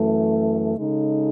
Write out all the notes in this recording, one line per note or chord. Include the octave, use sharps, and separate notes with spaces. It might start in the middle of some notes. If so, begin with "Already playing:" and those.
Already playing: F#2 E3 A3
C#3 G#3 D#4 A4